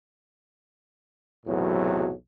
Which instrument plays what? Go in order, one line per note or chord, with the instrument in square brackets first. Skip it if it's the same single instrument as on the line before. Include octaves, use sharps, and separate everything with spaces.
[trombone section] B1 E2 A2 C3 F#3